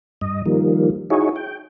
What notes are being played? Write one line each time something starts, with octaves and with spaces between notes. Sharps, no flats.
G2 D#5
D#3 F3 G3 A#3
D#4 E4 F#4 G#4 C#5
G5